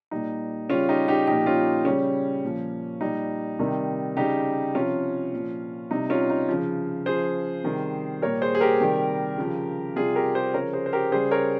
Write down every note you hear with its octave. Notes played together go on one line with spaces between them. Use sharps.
A#2 G3 D#4
C#3 G3 C#4 F4
D#4 G4
D#4 G4
A#2 F3 D#4 G4
C#4 F4
C#3 G3 C#4
A#2 F3
A#2 G3 D#4
C3 D#3 G3
C#3 G3 D#4 G4
C3 F3 C#4 F4
A#2 F3
C3 G3 D#4
C#4 F4
D#4
C#3 F3
C#3 F3 G#4 C5
C3 D#3 G3
A#2 G3 A#4 C#5
G#4 C5
G#4
G4 A#4
C3 D#3 G3
C#3 F3
C3 G3 F4 G#4
G4 A#4
G#4 C5
C#3 F3 A#4 C#5
G#4 C5
C5
G4 A#4
C#3 G3 G#4 C5
A#4 C#5